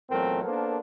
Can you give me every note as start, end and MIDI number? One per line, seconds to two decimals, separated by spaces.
0.10 0.43 40
0.10 0.43 46
0.10 0.43 54
0.10 0.43 57
0.10 0.43 60
0.10 0.43 70
0.43 0.77 58
0.43 0.77 59
0.43 0.77 62
0.43 0.77 69
0.43 0.77 70
0.43 0.77 72